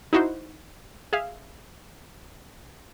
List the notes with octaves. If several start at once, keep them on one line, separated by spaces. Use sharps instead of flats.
D#4 E4 F#4 C5
G#4 E5 F5